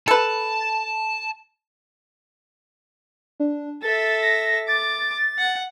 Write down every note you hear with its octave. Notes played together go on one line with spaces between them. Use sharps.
A4 B4 A5
D4
A4 E5 A6
A#6
D6 A6
F#5